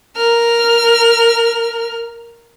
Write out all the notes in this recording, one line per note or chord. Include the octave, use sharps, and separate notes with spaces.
A#4 F6